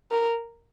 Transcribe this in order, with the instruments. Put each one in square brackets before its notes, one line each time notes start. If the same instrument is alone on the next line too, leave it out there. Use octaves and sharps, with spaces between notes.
[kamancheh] A#4